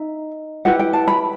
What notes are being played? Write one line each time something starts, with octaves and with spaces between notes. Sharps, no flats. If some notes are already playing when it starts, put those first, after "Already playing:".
Already playing: D#4 E5
E4 G4 B4 F#5
G5
A5
B5